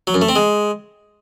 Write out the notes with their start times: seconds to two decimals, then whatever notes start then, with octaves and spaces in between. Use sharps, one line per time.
0.07 F#3
0.14 F#2
0.22 A3
0.29 C4
0.36 G#3